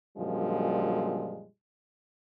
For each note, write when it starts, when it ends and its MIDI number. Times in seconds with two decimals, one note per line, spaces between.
0.17 1.45 42
0.17 1.45 46
0.17 1.45 50
0.17 1.45 53
0.17 1.45 55
0.17 1.45 56